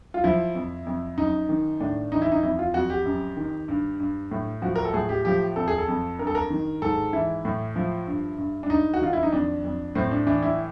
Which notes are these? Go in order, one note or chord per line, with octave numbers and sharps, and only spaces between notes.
F4
F3 E4
F2
F2
F#2 D#4
D#3
A2 D4
E3 D#4
E4
D#4
F2 E4
F4
F2 F#4
G4
F#2
D#3
G2
G2
A2
F3 F#4
A#4
A4
A2 G#4
G4
F3 G4
F2 A4
G#4
A4
F2
G2 A#4
A4
A#4
D#3
G#2 A4
E3 E4
A2
F3
G2
G2
D4
G2 D#4
F#4
D#3 F4
E4
D#4
F2 D4
F2
A2 C4
D4
E3 D4
E4